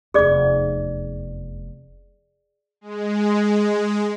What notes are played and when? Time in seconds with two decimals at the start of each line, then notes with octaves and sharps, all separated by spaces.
0.14 F1 E2 G#4 D5 D6
2.81 G#3